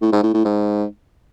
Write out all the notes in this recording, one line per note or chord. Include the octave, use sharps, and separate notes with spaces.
A2
G#2
A2
A2
G#2